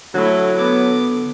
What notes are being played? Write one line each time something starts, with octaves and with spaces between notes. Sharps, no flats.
D3 F#3 A3 E4 A4
B3 D6